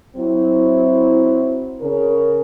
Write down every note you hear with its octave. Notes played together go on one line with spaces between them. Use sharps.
F#3 C4 E4
C#3 A#4 C#5